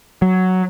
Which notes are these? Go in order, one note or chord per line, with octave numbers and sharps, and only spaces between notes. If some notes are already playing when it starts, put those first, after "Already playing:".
F#3